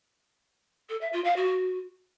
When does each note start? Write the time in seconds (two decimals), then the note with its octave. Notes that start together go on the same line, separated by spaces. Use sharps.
0.89 A4
1.01 E5
1.13 F4
1.24 F5
1.36 F#4